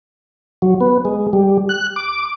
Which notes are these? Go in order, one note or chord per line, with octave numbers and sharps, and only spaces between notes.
F#3
B3
G#3
G3
F#6
D6